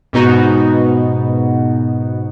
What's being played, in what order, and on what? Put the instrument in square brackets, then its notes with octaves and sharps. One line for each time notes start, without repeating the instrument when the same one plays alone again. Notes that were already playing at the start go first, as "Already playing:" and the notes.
[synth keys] G#2 B2 B3 D#4 F#4